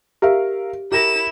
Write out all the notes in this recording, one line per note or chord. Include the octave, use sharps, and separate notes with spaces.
G4 A#4 E5 F5
E4 G4 A#4 A#6 E7